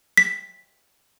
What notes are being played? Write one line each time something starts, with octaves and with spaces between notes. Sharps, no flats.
B6